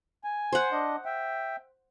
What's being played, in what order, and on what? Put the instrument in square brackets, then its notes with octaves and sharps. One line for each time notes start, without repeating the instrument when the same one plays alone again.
[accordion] G#5
[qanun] C5 F#5
[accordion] D4 D#5
E5 G5